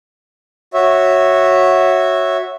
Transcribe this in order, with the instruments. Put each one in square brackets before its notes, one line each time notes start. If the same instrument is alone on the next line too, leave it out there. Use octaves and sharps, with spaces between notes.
[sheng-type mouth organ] F#4 C#5 E5